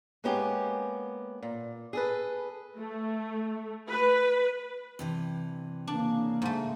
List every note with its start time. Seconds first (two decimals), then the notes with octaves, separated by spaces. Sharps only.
0.24 G#3 A#3 B3 C#4 G4
1.42 A#2
1.93 G#4 A4 B4
2.76 A3
3.90 B4
4.99 G2 C3 E3
5.87 C#3 A#3 D4
6.42 G#2 A3